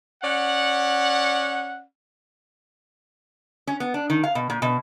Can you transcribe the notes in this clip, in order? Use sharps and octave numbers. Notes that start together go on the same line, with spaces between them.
C#4 D5 F#5
C#4
B3
D4
D#3
F5
B2
A#2
B2